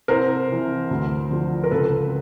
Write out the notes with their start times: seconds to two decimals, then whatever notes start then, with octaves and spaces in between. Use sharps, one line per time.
0.08 C2 A#4 C5
0.49 C3 E3
0.91 D2
1.30 D3 F3
1.64 A#4
1.71 C#2 A4 B4